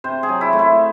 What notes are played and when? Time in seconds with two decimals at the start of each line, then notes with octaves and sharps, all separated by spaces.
0.04 C3 C5
0.23 G#4
0.29 F#3
0.41 E4
0.53 A3
0.59 E4